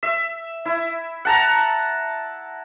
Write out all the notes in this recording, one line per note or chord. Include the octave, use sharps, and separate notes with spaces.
E5
E4
F#5 A5 A#5